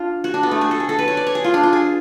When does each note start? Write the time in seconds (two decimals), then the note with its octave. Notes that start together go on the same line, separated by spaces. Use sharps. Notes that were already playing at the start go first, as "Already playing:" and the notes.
Already playing: D4 F4
0.24 F#4
0.34 D4
0.43 B3
0.51 A3
0.61 G#4
0.71 A4
0.80 G#4
0.89 A4
0.99 B4
1.08 C#5
1.17 D5
1.27 C#5
1.35 G#4
1.44 F4
1.54 D4
1.63 F4
1.73 G#4